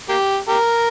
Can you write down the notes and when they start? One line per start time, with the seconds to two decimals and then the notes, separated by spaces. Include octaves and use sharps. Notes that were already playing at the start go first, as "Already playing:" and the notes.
0.09 A#3 G4
0.48 G4 A#4